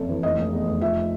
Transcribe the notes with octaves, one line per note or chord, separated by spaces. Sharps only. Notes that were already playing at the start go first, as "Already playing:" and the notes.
Already playing: F#1 F2 A4
E3
F1 D#5
F1
E2
F1
F3 E5